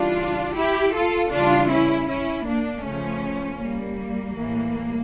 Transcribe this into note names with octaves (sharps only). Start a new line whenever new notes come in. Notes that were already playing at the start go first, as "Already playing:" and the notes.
Already playing: C#3 E3 G3 D4 F4
E4 G4
F4 A4
C#3 E3 G3 D4 F4
C#4 E4
C#4 E4
A#3 D4
C#3 F3 A3 C#4
G3 A#3
A2 E3 G3